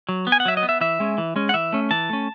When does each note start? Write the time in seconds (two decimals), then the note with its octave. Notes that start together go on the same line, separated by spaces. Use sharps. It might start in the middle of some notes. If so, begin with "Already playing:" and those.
0.09 F#3
0.27 B3
0.32 G#5
0.40 F#5
0.45 F#3 E5
0.57 D#5
0.63 B3
0.69 E5
0.81 E3 E5
1.00 G#3 C#4
1.18 E3
1.36 G#3 C#4
1.49 F#5
1.54 E3 E5
1.73 A3 C#4
1.91 E3 A5
2.09 A3 C#4